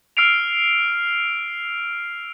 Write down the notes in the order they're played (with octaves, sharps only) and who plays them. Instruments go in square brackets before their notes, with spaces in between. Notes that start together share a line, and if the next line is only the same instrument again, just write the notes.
[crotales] E6 F6 C7 D7 F7